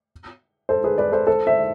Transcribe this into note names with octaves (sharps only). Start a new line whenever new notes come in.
A4 C5
G#4 B4
B4 D5
A4 C5
A4 C5
C5 E5